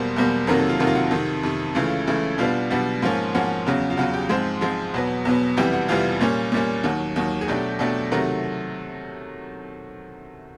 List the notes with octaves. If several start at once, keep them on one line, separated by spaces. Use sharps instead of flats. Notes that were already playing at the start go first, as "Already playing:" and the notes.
Already playing: E2 B2 G3 A#3 C5
E2 B2 G3 A#3
F2 C3 D#3 F#3 A#3 A#4
A4
F4
F2 C3 D#3 F#3 A#3 F#4
F4
F#4
F2 C3 D#3
F2 C3 D#3
C#2 C#3 E3 A3 F4
C#2 C#3 E3 A3
B2 G3 B3 D4 F4
B2 G3 B3 D4 F#4
G#2 F3 A#3 C#4
G#2 F3 A#3 C#4 F#4
E2 C#3 F#3
F4
E2 C#3 F#3 F#4
G4
G#2 F3 G#3 C4
G#2 F3 G#3 C4
E2 B2 F#3 B3
E2 B2 F#3 B3
F2 C3 E3 G3 B3 G4
F#4
F2 C3 E3 G3 B3 F4
A#2 G3 A#3 C#4
A#2 G3 A#3 C#4
D#2 D#3 F#3 F#4
D#2 D#3 F#3
G#4
B2 F#3 A3 D4 G4
B2 F#3 A3 D4
C3 D#3 F#3 A3 A#4